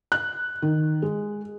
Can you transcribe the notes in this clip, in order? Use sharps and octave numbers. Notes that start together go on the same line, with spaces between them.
F#6
D#3
G#3